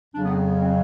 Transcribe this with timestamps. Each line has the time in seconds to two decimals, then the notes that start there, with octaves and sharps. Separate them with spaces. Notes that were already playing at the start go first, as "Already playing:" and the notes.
0.15 F2 C#3 F#3 D4
0.24 B3
0.30 C4
0.46 B3
0.62 C4